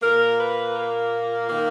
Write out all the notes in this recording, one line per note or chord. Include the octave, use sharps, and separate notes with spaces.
A#2 A#3 A#4
B4
A#4
D#3 A#3